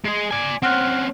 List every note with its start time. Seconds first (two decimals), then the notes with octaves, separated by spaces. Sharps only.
0.04 G#3 G#4
0.31 D5 G#5
0.63 C4 C#4 F#5 F6 F#6